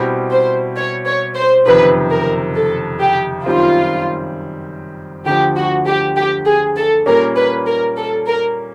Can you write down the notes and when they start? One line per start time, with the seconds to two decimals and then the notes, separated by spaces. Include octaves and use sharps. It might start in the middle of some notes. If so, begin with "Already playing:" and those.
Already playing: B2 G3 C4 E4 G4
0.31 C5
0.76 C#5
1.06 C#5
1.36 C5
1.66 F#1 F2 C3 D#3 B4
2.11 A#4
2.56 A4
3.01 G4
3.46 F#2 D#3 G3 C4 F4
5.26 D2 D3 F3 G4
5.56 F#4
5.87 G4
6.17 G4
6.46 G#4
6.77 A4
7.06 A#2 G3 A#3 C#4 A#4
7.36 B4
7.67 A#4
7.97 A4
8.27 A#4